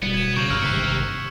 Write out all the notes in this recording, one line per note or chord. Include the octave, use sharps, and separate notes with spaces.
D1 B2 G3 B3
G#6 E7
C#3 A#3 A#4 C#6 G6 F#7
G1 G2 F#3 E6 F6 F#7
G#1 G2 C3 F#6 B6 C#7